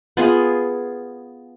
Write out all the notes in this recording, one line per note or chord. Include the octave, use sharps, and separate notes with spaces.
B3 F4 G#4